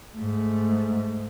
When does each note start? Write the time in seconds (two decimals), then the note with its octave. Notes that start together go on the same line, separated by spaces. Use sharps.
0.16 G#2 A3